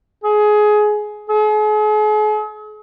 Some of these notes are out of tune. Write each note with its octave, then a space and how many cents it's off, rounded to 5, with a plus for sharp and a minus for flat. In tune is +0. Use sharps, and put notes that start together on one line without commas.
G#4 +20
G#4 +40